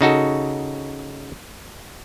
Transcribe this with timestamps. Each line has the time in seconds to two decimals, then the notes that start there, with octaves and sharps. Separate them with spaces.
0.01 C#3 D#4 F#4 A4